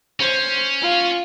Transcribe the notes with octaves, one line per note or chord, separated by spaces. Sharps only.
C#4 C5
F4